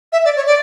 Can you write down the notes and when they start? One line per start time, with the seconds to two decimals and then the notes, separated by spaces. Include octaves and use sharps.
0.12 E5
0.25 D5
0.36 C#5
0.47 D5